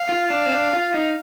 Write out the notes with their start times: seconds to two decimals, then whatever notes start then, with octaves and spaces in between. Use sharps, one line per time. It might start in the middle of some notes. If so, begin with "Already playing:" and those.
Already playing: F5
0.09 F4
0.30 D4
0.46 C4
0.52 D4
0.73 F4
0.94 D#4